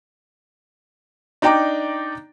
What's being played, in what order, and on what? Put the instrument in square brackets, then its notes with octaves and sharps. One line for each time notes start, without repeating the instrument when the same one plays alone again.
[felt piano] D4 D#4 D5 G5 A#5 D6